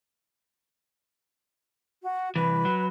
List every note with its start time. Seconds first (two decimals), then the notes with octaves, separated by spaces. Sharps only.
2.03 F#4
2.36 C2 E3 B4
2.65 F#3